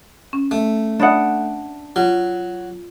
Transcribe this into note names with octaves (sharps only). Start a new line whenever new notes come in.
C#4
A3
D4 E5 F#5 B5 D#6
F#3 F4